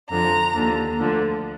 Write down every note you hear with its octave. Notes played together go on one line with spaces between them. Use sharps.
F2 D3 F3 A#5
D#2 D3 F3
D2 D3 F3